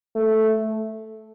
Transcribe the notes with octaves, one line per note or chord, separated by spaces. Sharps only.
A3